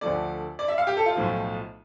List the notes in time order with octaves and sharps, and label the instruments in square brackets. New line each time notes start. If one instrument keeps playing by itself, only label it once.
[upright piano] D2 D3 F3 A3 D5
D5
E5
F5
G4
A4
F4
B1 A2 F3